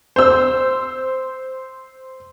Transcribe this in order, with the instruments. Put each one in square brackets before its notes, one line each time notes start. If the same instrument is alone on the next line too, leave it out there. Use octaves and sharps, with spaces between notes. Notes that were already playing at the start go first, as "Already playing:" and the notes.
[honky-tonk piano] C5 E6